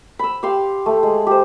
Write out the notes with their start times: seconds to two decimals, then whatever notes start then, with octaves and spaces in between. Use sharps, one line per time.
0.19 B5 E6
0.43 G4 F5 C6
0.86 A3
1.03 G#3
1.27 G4 C5